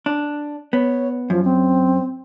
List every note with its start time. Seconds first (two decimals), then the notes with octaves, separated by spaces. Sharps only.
0.06 D4
0.73 B3 C#5
1.30 F#2 F3
1.44 C4